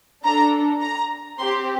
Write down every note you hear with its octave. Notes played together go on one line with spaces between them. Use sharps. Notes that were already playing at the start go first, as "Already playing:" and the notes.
D4 A4 A#5
A#5
C4 G4 C6